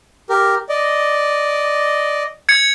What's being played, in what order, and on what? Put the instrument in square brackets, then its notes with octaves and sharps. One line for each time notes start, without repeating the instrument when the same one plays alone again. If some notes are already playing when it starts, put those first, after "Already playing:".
[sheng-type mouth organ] G4 A#4
D5 D#5
[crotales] G#6 C#7